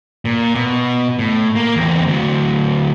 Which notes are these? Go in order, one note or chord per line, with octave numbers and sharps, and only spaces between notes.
A#2
B2
A2
A#3
E2 C4
D2 F#3